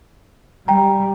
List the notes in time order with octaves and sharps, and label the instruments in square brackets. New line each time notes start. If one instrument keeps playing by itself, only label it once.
[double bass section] G3 [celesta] G5 A#5